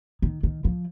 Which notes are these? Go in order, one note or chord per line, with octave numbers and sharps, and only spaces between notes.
D#3
D#3
F3